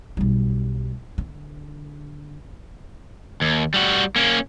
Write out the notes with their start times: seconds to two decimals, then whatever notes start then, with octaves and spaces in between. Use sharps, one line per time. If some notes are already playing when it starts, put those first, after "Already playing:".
0.17 B1 G3
1.18 D3
3.41 D#2
3.74 G3 F#4
4.16 A#3 C#4